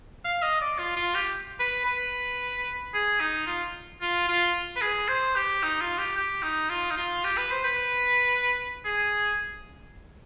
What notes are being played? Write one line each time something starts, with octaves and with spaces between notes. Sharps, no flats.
F5
D#5
D5
F4
F4
G4
B4
B4
G#4
D#4
F4
F4
F4
B4
G#4
C5
G4
D#4
F4
G4
G4
D#4
F4
D#4
F4
G4
B4
C5
B4
G#4